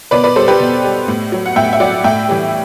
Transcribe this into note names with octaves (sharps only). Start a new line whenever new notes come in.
B2 B4 D5
B4 D5
G3 A4 C5
G4 B4
B2
G3
A2
F#3
F#5
A2 E5 G5
E5
F#3 D5 F#5
A2 E5 G5
E3 G3